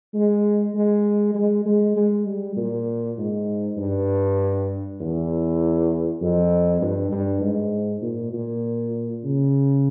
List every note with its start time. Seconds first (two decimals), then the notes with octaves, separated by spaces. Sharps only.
0.14 G#3
0.75 G#3
1.35 G#3
1.66 G#3
1.96 G#3
2.26 G3
2.57 A#2
3.18 G#2
3.77 G2
5.00 E2
6.21 F2
6.81 G2
7.11 G2
7.41 G#2
8.02 A#2
8.33 A#2
9.24 C#3